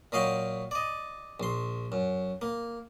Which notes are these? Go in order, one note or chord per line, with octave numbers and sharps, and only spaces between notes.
A#2 F#3 D#5 F5 G5
D5 D#5
A#1 C6
F#2
A#3